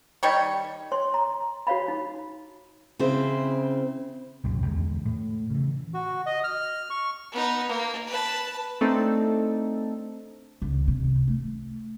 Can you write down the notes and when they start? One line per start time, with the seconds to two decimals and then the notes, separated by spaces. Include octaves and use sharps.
0.23 D#3 G3 C#5
0.92 C#5 C6
1.14 A#5
1.67 F#4 C#5 F5 B5
1.88 D#4
2.99 C#3 C4 E4 C5
4.44 C2 F#2 A#2 F#3
4.65 E2 D3 G#3
5.05 A2
5.50 C#3 E3
5.94 F#4
6.26 D#5
6.44 F6
6.90 C#6
7.32 B3 D#4
7.68 A#3
8.07 B4 A5
8.81 A3 C4 D4 D#4 A4
10.62 C#2
10.88 C3
11.28 A3